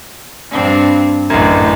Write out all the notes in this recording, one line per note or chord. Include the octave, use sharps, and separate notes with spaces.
G2 C4 D4
A1 F#2 A2 D3